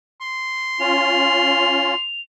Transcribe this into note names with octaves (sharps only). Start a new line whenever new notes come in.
C6
C#4 F4 F7